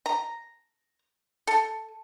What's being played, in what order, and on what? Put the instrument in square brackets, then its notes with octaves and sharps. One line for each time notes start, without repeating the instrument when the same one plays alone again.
[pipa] A#5
A4